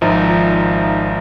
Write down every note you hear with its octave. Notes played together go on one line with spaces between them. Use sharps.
G#1 F3 D#4 E5 A#5